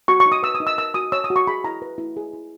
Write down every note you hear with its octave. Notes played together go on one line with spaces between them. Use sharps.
F#4 C#6
C#6
D#4
D#6
B4 E6
D#6
D#4
E6
A#4 E6
F#4 D#6
C#5 E6
D#6
F#4
C#6
G#4 B5
E4 A#5
B4
E4
G#4
E4